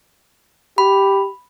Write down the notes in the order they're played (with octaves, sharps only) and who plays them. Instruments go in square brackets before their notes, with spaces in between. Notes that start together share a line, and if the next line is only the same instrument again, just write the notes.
[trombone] G4 [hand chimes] B5